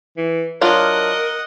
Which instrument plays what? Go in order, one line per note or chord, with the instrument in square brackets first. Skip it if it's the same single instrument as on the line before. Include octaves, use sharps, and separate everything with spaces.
[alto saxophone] E3
[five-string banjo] F#3 D4 F4 [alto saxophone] A#4 [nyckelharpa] D#5 F#5